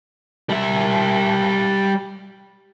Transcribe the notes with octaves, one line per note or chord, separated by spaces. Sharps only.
G3 E5